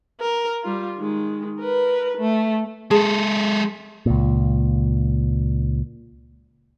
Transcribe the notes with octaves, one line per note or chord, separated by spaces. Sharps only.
A#4
G3 F4
D#3 G#3
A#4 B4
A3
G#3 G#4 A4 A5
C#2 A#2